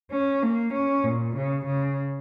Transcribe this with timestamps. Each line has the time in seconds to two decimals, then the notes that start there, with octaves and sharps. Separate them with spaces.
0.11 C#4
0.43 A#3
0.74 C#4
1.04 A#2
1.36 C#3
1.66 C#3